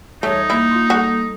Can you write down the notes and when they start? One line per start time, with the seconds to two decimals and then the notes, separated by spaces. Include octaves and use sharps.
0.23 E2 G3 A3 D#4 C#5
0.50 A#3 E4
0.71 F4 C6
0.90 G3 F#4 A4